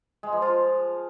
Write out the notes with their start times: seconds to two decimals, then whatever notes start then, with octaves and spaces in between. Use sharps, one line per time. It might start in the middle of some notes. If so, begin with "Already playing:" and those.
0.23 G#3
0.33 F3
0.42 F4